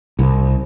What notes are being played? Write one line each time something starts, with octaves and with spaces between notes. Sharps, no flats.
C2